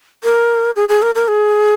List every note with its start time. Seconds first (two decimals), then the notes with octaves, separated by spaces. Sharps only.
0.24 A#4
0.76 G#4
0.89 G#4
1.02 A#4
1.15 A#4
1.28 G#4